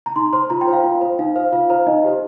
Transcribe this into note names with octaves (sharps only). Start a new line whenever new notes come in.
A#5
D#4 C6
C5 C6
F4 A#5
G5
C5
F5
F4
C5
D#4 F5
C5 F5
F4 F5
C5 A#5
D#4 D#5
G4 C5